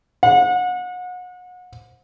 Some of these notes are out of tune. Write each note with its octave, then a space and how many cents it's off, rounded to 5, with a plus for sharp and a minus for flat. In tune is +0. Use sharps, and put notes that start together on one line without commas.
F#5 -35